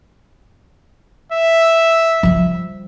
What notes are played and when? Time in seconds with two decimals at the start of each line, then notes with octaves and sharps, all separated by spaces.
1.32 E5
2.23 F3 G3